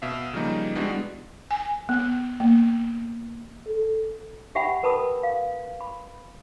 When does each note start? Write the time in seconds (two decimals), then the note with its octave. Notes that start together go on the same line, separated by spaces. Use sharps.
0.02 B2 E5 F5
0.33 C#3 F3 G3 A#3 D#4
0.75 G3 G#3 B3 D4 E4 F#4
1.51 G#5
1.89 B3
2.40 A#3
3.67 A4
4.55 G4 E5 F#5 G5 B5
4.83 A#4 B4 A5 B5 D#6
5.23 F5
5.81 B5